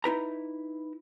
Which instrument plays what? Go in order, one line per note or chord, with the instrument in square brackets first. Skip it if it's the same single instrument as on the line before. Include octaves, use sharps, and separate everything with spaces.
[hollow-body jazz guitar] D#4 E4 B4 A#5